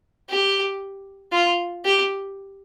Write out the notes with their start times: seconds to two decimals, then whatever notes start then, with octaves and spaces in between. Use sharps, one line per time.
0.29 G4
1.32 F4
1.85 G4